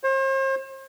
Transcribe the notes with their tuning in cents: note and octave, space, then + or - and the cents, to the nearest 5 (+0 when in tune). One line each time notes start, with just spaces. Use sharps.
C5 +40